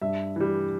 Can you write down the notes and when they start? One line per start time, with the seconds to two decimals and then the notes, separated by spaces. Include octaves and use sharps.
0.01 G2 E5
0.36 E3 G3